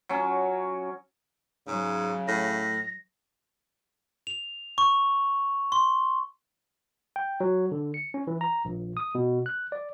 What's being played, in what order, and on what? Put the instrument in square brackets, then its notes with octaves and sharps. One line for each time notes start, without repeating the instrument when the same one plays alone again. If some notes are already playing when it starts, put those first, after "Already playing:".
[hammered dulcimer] F#3 C#4
[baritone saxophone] G#2 [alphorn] C#3 [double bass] F#3
[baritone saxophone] A2 [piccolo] A#6
[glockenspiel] F7
C#6
C6
[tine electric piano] G5
F#3
D3
C#7
C#4
E3
A#5
A#1
D#6
B2
F#6
D5